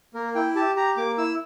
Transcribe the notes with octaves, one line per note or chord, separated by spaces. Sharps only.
A#3 A#4
E4 G5
G4 A5
G4 A#5
A#3 D6
E4 E6